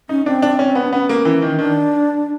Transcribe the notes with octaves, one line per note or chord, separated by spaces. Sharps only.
C#4 D#4
C4 D4
D4
C#4
B3
D4
B3 C#4
A#3
E3
D#3
D#3 D4